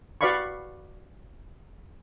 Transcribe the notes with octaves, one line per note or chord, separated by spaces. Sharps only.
F#4 B4 D5 F5 B5 C#6